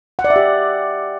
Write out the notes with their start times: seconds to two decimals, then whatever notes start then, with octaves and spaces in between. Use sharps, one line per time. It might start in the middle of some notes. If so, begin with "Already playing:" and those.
0.19 F#5
0.24 D5
0.30 E5
0.36 G4